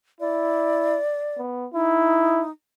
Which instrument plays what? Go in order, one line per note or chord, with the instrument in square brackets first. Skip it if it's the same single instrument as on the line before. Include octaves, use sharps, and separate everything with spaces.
[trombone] E4 [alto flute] D5
[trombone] B3
[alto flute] D#4 [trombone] E4